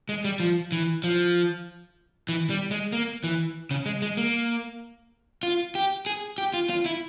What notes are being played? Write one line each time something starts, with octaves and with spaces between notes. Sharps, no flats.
G#3
G3
F3
E3
F3
E3
G3
G#3
A#3
E3
C#3
G#3
G#3
A#3
F4
G4
G#4
G4
F4
F4
E4